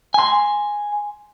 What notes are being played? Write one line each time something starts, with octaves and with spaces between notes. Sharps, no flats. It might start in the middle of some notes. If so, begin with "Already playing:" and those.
G#5 C6